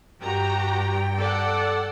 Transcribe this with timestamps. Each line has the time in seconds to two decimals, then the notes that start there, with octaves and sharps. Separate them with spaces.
0.21 G2 F#4 G4 G5 A#5
1.18 A4 D5 F#5